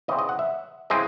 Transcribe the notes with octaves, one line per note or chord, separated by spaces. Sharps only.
E2 C#3 E3 C4 D#5
D#5
F#5
E5
C#3 E3 G#3 C4 D#5